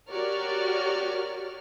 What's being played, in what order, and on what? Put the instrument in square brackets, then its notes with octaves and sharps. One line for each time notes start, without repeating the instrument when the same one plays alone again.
[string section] F#4 G4 A#4 C#5 D5 F6